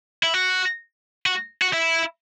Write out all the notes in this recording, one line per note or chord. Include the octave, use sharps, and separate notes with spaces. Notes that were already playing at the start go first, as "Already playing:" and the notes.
E4
F#4
F#4
F#4
E4